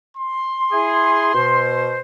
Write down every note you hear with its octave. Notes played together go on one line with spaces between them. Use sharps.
C6
E4 G#4
B2 C5